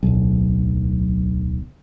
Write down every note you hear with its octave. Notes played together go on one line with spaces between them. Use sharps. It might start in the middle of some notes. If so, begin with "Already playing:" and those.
D1 B1